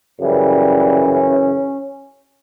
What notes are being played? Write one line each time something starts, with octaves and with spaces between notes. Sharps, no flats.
F#2 C#3 E3 G3
C#4